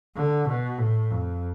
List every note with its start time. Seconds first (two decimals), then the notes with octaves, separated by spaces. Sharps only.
0.16 D3
0.48 B2
0.78 A2
1.11 F2